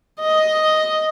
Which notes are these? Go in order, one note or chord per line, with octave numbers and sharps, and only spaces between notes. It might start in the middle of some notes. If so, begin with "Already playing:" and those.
D#5